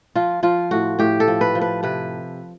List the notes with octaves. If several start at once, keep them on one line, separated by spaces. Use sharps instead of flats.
F3 F4
F3 F4
A2 F#4
A2 G4
A4
F3
B4
F3
B4
C3 B4